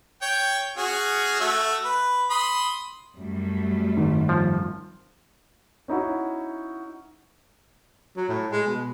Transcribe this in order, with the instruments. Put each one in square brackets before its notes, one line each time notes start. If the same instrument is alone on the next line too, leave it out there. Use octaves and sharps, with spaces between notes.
[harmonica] C#5 G5
C#4 F#4 G#4
A3 F#4 E5
B4
B5 C6 D#6
[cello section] F#2 G3 A3
[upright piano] G#1
[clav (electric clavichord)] F3
[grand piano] C#4 D#4 E4 F#4
[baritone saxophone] F#3
A2
G#3
B2